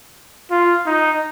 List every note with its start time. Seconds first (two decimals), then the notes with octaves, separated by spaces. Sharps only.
0.51 F4
0.86 D#4